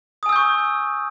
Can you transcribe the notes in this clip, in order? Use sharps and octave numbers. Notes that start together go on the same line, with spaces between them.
G#5 C#6 D#6 E6 G6